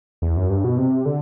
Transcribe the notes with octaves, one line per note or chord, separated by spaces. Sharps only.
E2
F#2
G2
B2
C3
D3